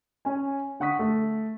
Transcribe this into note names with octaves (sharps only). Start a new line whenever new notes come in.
C#4 C#5 G#5
D3 F#5 C#6 D#6 B6
A3